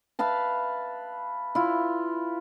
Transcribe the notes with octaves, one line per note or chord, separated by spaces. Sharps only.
B4 E5 F5 A5
E4 F4